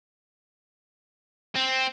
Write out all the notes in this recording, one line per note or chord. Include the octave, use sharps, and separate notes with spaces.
C4